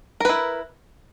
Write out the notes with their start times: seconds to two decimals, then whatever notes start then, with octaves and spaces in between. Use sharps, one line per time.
0.20 A#4
0.25 B4
0.29 E4